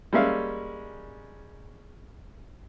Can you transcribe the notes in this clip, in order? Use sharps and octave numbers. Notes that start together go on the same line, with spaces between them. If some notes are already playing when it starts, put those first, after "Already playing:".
G3 G#3 A#3 C#4 E5 F5